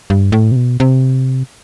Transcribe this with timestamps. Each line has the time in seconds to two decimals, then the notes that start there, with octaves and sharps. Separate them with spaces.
0.10 G2
0.32 A2
0.52 C3
0.56 B2
0.80 C3